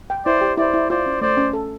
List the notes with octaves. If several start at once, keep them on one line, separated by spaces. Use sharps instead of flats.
G5
E4 C5 D5
G4
E4 C5 D5
E4
F4 C5 D5
C#4
A3 C5 D5
C#4
A4